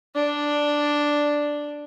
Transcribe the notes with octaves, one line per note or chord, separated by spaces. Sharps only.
D4